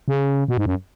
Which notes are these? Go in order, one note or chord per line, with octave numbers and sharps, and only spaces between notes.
C#3
B2
G#2
F#2